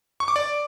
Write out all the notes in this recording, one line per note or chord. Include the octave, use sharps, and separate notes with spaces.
C#6
D6
D5